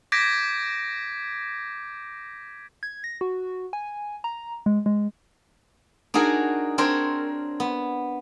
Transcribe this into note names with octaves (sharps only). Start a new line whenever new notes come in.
D6 G6 G#6 A#6 B6 D7
G#6
A#6
F#4
G#5
A#5
G#3
G#3
D4 D#4 F#4 G#4 A#4
C4 D4 A#4 C5 C#5
B3